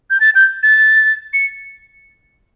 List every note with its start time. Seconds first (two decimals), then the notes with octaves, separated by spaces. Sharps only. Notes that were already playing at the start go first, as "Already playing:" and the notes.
0.10 G6
0.20 A6
0.35 G6
0.63 A6
1.33 C#7